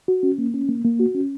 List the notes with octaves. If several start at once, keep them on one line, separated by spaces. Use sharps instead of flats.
F#4
C#4
A#3
C#4
A#3
A#3
F#4
C#4